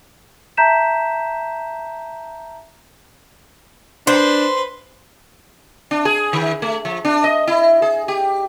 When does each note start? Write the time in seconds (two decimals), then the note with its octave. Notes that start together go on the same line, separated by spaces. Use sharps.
0.57 E5 A5 A#5 G6 B6 E7
4.07 D4 B4 C5 C6
5.91 D4
6.05 G#4
6.33 D#3
6.62 A3
6.85 F3
7.05 D4
7.24 D#5
7.47 E4
7.82 G#4
8.08 G4